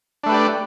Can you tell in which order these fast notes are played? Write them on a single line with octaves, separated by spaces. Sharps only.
D4 A3 B4 G4 D5